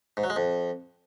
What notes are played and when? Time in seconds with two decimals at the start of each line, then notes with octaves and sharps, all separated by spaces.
0.17 G#2
0.24 F#3
0.30 G#3
0.36 F2